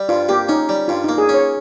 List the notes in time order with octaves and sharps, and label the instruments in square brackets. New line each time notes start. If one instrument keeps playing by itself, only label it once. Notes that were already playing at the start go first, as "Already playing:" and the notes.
Already playing: [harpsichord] G3
[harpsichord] G2 [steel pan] F4
[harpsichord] A#3 [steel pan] G4
[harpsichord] C#4 [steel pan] D#4
[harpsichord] G3
[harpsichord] G2 [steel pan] F4
[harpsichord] A#3 [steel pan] D#4
[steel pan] G#4
[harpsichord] C#4
[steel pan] C#5